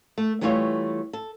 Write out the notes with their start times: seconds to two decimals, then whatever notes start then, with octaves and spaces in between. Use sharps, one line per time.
0.18 A3
0.41 E3 G3 A3 E4 F4 C#5
1.13 A4